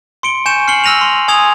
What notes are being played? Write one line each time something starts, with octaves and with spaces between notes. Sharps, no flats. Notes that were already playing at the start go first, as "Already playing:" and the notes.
C6 C#7 D7 G7
G#5 C#6 G6 C#7 E7
F6 C7 C#7 F#7 G7
E6 F6 A#6 D#7 F7
C6
G#5 C6 D#6 G#6 F7